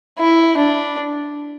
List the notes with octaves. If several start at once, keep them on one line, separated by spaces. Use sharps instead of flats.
E4
D4